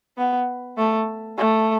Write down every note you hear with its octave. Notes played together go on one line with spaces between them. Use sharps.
B3
A3
A3